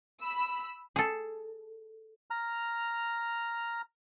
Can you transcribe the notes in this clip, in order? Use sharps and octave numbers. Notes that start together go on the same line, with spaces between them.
B5 E6
G#4 A4
A#5 F6